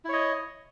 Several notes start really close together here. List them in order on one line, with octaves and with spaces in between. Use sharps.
E4 C#5 D#5